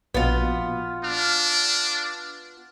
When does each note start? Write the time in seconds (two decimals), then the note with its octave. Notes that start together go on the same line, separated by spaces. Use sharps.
0.14 A#1 B2 B3 F4
1.04 D4 F6